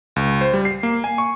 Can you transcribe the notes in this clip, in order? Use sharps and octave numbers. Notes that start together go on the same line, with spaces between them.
C#2
C5
G3
C7
A#3
G#5
C#6